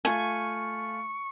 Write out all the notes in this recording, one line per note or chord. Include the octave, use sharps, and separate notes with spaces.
A3 F4 G#5 C#6